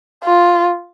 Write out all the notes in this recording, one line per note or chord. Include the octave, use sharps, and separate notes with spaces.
F4